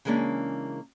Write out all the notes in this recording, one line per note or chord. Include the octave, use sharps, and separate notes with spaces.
C#3 E3 G#3 A#3 C#4 D4